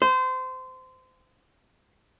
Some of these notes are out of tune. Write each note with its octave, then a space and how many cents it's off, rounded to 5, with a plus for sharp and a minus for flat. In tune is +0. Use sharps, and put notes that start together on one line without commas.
C5 -25